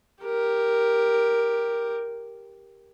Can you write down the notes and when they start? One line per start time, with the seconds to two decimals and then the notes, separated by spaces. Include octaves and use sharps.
0.25 G4 A#4